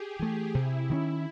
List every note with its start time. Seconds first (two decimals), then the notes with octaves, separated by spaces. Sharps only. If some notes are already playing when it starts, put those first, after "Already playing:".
Already playing: G4 G#4
0.19 E3 A3 G4
0.55 C3 E4
0.90 D#3 G#3 C#4